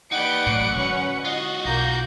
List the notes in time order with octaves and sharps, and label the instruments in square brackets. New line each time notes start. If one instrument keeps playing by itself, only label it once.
[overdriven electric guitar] D#4 G4 [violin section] B4 D5 D7 [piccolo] F#5
[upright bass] A1 A2 [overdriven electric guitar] F#2
[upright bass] D3 G#3 [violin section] C#4 B4 C#6
[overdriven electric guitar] F4 F#4 [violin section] D#5
[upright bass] B1 [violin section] A#3 G6 [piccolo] A#6